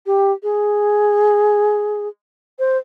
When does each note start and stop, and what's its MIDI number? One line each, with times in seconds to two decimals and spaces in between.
0.06 0.32 67
0.43 2.08 68
2.59 2.78 72